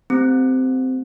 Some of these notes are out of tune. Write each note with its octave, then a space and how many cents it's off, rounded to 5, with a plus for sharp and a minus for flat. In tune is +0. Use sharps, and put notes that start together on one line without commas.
A3 +0 C4 -15 G4 +0